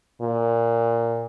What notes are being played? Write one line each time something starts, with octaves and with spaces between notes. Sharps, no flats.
A#2